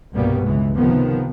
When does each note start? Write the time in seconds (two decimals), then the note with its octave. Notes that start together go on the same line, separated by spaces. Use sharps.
0.13 G1 C2 B2 G3 A#3 B3
0.45 C#2 E3 G#3
0.76 C3 D#3 F3 B3